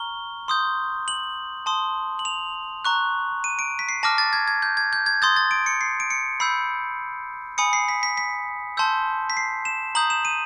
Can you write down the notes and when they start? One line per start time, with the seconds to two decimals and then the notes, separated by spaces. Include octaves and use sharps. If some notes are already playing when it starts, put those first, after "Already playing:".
Already playing: A#5 C#6 F6 G7
0.48 C6 D#6 G6
1.08 F#7
1.66 A5 C6 D#6
2.19 F#7
2.25 F7
2.85 A#5 C#6 F#6
3.44 D#7
3.59 D7
3.79 B6
3.89 C7
4.03 A5 D6 F6 A#6
4.18 A6
4.33 G#6
4.48 G#6
4.62 G6
4.77 G#6
4.93 G6
5.06 G#6
5.22 C6 D#6 G6 A6
5.36 A6
5.51 D7
5.66 C#7
5.81 C7
6.00 D7
6.10 C#7
6.40 B5 E6 G6 C7
7.58 G#5 B5 D#6 C#7
7.73 C7
7.88 B6
8.03 B6
8.17 B6
8.77 A5 C6 E6 G6
9.30 B6
9.37 C7
9.65 E7
9.95 A#5 D#6 G6 F#7
10.10 E7
10.25 D#7